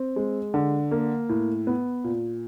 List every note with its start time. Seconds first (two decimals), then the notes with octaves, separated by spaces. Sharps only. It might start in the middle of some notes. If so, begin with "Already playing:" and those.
Already playing: C4
0.16 G#3
0.54 D3
0.91 A#3
1.29 A2
1.67 B3
2.04 A#2